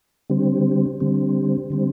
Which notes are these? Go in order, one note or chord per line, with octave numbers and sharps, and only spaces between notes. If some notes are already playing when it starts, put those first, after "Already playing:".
D3 G3 C4
D3 G3 C4
D3 G3 C4